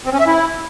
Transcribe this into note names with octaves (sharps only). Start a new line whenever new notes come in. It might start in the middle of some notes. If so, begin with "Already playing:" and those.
C4
C#4
E5
E4